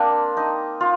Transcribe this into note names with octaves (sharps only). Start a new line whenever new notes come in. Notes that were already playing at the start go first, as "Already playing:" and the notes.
Already playing: A#3 C4 D4
D#4
F4